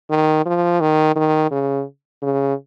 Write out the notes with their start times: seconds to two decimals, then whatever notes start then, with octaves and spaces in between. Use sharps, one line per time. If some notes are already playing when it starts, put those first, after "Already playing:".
0.10 D#3
0.46 F3
0.81 D#3
1.16 D#3
1.51 C#3
2.22 C#3